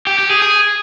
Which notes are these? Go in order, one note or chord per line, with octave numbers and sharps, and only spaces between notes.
G4
G4
G#4
G#4